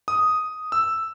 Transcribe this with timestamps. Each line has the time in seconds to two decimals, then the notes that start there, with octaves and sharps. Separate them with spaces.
0.08 D#6
0.72 E6